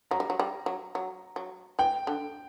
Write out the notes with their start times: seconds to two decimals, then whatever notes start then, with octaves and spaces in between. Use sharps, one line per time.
0.11 F#3 A#5
0.20 G3
0.30 F#3
0.40 G3
0.66 F#3
0.95 F#3
1.36 F#3
1.79 E3 G5
2.07 D3